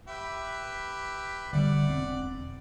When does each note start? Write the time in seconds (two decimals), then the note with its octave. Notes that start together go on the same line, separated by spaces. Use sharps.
0.08 G4 B4 E5
1.53 E1 D3 G3 D5 F#5
1.87 E1 C4